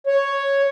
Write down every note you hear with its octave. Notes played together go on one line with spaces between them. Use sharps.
C#5